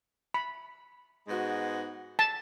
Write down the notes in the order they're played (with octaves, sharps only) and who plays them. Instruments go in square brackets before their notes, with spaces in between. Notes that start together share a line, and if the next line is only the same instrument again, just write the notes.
[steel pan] B5
[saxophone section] G#2 G#3 B3 F#4
[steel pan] A5